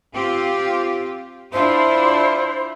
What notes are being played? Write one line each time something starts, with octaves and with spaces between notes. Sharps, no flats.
C4 F4 G4
D4 E4 F4 C5